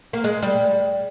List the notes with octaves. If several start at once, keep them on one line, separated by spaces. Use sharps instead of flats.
A#3
G#3
G3